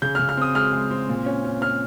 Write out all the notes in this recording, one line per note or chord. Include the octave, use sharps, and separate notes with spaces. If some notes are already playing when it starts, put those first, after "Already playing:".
C#3 G6
C#3 F6
F6
C4 D#6
G#3 F6
G#3
C4
A#2
C#4
C#4
C#4 F6